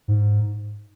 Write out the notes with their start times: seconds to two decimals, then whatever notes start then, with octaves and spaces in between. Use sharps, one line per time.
0.08 G#2